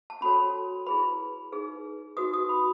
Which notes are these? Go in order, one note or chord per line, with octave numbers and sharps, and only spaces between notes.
A5
C#4 F#4 A4 C#5 B5
E4 G#4 B4 B5
D#4 G#4 B4
D#4 F#4 B4 D#6
D#6
B5